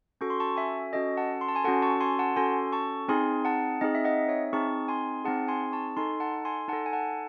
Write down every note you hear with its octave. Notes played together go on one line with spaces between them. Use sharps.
C#4 F#4 A4 C#6
C6
A5 C#6
E5 G#5
C#4 F#4 A4 D#5
F#5 A5
C6
A5
G#5 C6
C#4 F#4 A4 F#5 A5
A5 C#6
G#5 C6
F#5 A5
C#4 F#4 A4 G#5 C6
A5 C#6
C4 D#4 G#4 G#5 C6
F#5 A5
C4 D#4 G#4 D#5
E5
D#5 F#5
C#5 E5
C4 D#4 G#4 A5 C#6
G#5 C6
C4 D#4 G#4 F#5 A5
G#5 C6
A5 C#6
D#4 A4 G#5 C6
F#5 A5
G#5 C6
D#4 A4 F#5 A5
G#5
F#5 A5